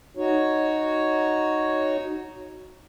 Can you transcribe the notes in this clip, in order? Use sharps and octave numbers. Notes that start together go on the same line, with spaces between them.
D#4 F#4 C#5